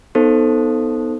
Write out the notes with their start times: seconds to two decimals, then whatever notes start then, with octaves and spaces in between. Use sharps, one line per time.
0.15 B3 D#4 A4 C5